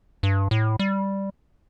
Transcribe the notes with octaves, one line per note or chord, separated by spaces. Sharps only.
G2
A2
G3